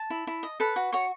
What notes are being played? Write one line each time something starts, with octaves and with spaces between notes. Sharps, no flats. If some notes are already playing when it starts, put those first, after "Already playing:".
Already playing: A5
E4
E4
D#5
A4 B4 B5
F#4
F#4 C#5 C#6